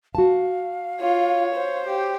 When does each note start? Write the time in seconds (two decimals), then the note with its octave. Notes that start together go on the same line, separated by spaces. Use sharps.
0.15 F#4 F5 A5
1.00 F4 C#5
1.55 C5
1.86 G4